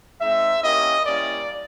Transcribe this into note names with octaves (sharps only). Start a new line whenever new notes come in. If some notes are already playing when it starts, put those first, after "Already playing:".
G#3 C4 D#4 E5
A#3 C#4 E4 G4 D#5
G3 A#3 C#4 E4 D5